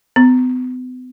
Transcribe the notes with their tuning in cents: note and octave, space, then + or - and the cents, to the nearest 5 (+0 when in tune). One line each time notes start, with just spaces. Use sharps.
B3 +40